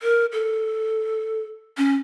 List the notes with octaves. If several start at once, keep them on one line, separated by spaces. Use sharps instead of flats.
A#4
A4
C#4